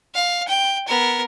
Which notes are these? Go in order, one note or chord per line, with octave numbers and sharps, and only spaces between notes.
F5
G5
B3 A#4